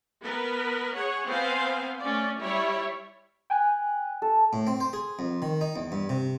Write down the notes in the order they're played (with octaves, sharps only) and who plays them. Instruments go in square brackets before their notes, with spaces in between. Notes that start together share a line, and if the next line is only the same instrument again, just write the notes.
[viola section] B3 A#4 B4
G#4 C#5 F#5
B3 C4 C5 F5 G#5
A3 C#4 D5
G3 E4 C#5
[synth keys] G5 G#5 F#6
[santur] A4
[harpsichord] A2
C4
C5
G#4
F2
D#3
D#4
E2
G2
C3